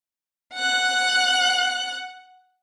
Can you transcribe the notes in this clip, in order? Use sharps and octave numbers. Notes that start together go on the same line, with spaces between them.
F#5 F#6